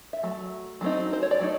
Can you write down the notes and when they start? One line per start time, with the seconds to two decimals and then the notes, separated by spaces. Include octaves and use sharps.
0.13 E5
0.23 F#3 A3
0.81 F#3 A3 C4 D#4
1.13 C5
1.23 C#5
1.31 D5
1.40 F#3 A3 D#4